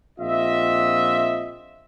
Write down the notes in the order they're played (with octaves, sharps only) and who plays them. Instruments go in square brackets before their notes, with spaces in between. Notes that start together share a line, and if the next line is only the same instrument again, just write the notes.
[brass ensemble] A#1 C4 F4 D#5 E5